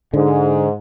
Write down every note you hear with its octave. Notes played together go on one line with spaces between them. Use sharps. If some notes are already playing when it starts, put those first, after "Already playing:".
G#2 D3